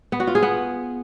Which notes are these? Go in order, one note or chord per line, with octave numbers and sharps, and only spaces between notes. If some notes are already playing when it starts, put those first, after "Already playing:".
B3
F#4
F4
G#4
B3